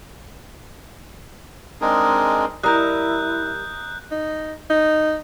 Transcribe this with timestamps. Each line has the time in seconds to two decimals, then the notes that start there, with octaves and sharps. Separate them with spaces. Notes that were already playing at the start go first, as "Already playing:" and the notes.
1.81 G#3 C4 D4 D#4 G#4 A#4
2.63 G3 E4 A#4 D#5 E5 A#5 F#6 G6
4.11 D#4
4.70 D#4